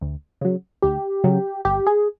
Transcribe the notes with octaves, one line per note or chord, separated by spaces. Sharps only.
D2
C#3 F#3
D2 G4
C#3 F#3
G1 G4
G#4